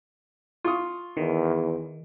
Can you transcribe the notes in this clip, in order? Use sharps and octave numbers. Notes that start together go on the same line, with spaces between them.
F4 C#6 D#6
E2 D#3